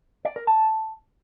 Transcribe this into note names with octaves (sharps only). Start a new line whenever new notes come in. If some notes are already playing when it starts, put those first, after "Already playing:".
D5
A#4
A5